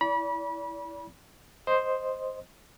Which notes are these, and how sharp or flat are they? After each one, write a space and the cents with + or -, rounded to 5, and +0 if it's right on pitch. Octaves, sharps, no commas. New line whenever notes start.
E4 +0 D5 -40 B5 -30
C5 +0 D#5 +0